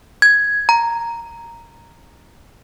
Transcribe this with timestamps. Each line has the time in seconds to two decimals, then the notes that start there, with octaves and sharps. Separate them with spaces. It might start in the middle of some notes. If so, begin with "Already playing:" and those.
0.22 G#6
0.69 A#5